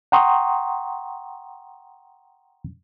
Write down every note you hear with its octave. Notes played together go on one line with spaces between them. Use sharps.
F#5 G5 A#5 C6 C#6 D#6